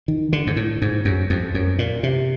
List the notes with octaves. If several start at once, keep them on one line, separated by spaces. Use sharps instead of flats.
D#3
D3
G#2
A2
G#2
F#2
F2
F#2
A#2
C3